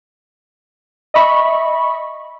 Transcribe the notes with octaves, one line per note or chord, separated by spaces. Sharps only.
D#5 E5 B5 C#6